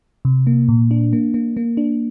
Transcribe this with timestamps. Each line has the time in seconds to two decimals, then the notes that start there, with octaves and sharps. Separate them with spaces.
0.25 C3
0.47 A#3
0.69 A#2
0.91 D4
1.13 A#3
1.34 A#3
1.57 A#3
1.77 D4